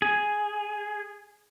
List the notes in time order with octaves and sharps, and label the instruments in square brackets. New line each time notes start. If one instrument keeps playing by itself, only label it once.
[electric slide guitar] G#4